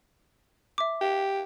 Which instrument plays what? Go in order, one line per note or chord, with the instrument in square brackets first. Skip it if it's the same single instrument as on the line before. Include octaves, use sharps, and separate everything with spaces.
[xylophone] E5 D6
[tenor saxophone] G4